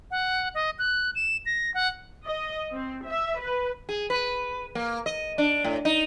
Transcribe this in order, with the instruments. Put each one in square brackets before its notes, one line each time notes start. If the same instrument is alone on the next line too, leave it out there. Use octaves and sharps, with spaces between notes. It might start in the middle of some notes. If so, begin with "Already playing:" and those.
[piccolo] F#5
D#5
F#6
E7
A#6
F#5
[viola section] D#5
C4
E5
B4
[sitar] G#4
B4
A#3
D#5
D4
A2
D#4